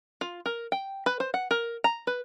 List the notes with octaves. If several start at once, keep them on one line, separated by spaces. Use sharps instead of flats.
F4
A#4
G5
B4
C5
F#5
A#4
A#5
B4